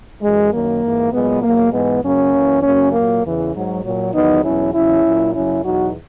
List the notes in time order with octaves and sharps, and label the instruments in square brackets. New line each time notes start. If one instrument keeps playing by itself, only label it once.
[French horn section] F#2 E3 G#3
F#2 D#3 F#3 A#3
G#2 E3
A#2 F#3 G#3 B3
E2 B2 F#3 A#3
G#2 E3 G#3 B3
F#2 C#3 F#3 A#3 C#4
F#2 E3
F#2 C#3 F#3 A#3 C#4
A#2 F#3 A#3
E2 C#3 E3
G#2 F#3
A#2 F#3
E2 D#3 F#3 B3 D#4
E2 B2 F#3 C#4 E4
E2 C#3 F#3 C#4 E4
A#2 F#3
F#2 C#3 F#3 C#4 E4
E2 B2 F#3 D#4 F#4